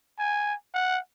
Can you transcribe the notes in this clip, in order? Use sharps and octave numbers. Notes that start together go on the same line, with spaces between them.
G#5
F#5